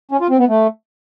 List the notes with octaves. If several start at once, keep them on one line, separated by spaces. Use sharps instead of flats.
C#4
F4
C4
B3
A3